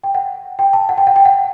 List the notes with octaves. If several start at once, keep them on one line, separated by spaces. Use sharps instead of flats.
G5
F#5
G5
A5
F#5
G5
F#5
G5
F#5